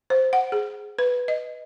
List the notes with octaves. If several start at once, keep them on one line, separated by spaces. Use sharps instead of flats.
C5
F#5
G#4
B4
D#5